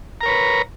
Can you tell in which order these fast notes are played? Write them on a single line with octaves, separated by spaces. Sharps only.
A#5 A#4 C#5 B4